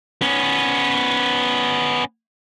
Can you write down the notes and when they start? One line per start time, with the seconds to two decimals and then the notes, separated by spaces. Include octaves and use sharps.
0.22 B3 C#4